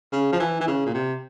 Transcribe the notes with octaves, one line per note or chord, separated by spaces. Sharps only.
C#3
F3
E3
E3
C#3
A#2
C3